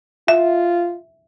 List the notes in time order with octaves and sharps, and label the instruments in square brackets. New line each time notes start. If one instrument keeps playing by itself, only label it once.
[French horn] F4 [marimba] E5